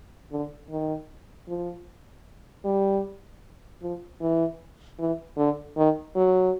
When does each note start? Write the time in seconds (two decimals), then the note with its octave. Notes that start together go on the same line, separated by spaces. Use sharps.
0.31 D3
0.70 D#3
1.48 F3
2.65 G3
3.82 F3
4.21 E3
4.99 E3
5.37 D3
5.77 D#3
6.15 F#3